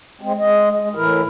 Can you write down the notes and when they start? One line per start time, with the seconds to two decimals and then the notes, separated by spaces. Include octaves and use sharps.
0.21 G#3 C4
0.40 G#3 D#5
0.79 G#3
0.95 A2 E3 E4 A#4